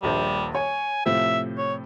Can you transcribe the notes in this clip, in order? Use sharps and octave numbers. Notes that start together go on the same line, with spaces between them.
D#1 A#1 G3 C5
C#5 G#5
A2 C3 F3 E5
C#5